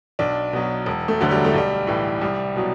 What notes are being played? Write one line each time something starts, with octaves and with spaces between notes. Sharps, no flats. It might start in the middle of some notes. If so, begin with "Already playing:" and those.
B1 D4
B2 F#3
E1
A3
D2 D3 F#3
G3
A3
B1 G3
A2 E3
C2 G3
B2 F#3